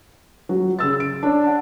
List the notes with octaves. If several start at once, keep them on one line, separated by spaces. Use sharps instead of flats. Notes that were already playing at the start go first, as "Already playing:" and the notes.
F#3
C#3 E6 A6
D7
D4 C#5
F#5 A5